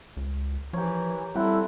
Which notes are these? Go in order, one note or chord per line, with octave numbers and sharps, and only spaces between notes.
C#2
E3 F3 G4 A#4 C#5
G3 C4 E4 A4 F#5